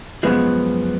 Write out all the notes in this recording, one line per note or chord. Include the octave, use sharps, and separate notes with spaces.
F#2 C#3 F3 G#3 B3